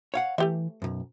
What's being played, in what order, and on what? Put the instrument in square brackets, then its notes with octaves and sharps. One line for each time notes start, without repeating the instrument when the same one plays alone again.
[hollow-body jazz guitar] C#5 F5 F#5
[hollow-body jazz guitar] E3 [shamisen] A3 G4 E5
[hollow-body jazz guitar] B1 F#2